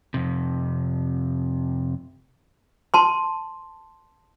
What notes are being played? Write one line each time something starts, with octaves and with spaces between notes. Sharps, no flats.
F2 C3
A5 C6